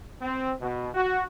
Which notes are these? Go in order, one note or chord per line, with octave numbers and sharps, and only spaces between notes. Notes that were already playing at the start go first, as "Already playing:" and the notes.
C4
B2
F#4